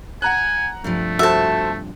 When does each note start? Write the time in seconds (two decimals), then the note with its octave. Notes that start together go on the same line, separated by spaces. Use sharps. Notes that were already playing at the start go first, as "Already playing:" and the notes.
0.22 F#5 G#5 A#5 F#6
0.84 G2 C3 F3 A3
1.19 F#4 A4 C5 E5 A5